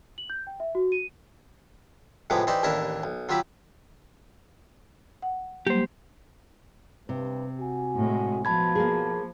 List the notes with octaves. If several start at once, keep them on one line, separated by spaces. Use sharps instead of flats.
F#7
G6
G5
E5
F#4
D#7
A2 C3 F3 G#3 B3 D6
E3 D#4 G4 C5 D5
A1 D#2 D4 E4 A#4 A5
B1
F#3 F4 G4 E5 B5 D6
F#5
F#3 G3 A#3 G4 C5
G2 C3 B4
F#4 G#5
A2 G#3
B2 F3 A5 B5 G#6
A#3 G#4